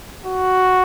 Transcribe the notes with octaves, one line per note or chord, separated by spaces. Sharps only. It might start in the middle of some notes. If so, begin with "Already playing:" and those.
F#4